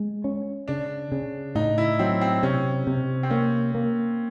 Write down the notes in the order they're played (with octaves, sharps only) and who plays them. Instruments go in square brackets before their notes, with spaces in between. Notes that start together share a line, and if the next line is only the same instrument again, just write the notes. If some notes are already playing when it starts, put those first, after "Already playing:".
Already playing: [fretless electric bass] G#3
C#4
[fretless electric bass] C#3 [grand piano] D4
[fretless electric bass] C#3
[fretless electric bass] A2 [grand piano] D#4
[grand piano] E4
[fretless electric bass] F#3 [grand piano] C4
[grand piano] C4
[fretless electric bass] C3 [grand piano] C#4
[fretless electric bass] C3
[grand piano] C4
[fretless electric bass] A#3 [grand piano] C#4
[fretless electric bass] A#3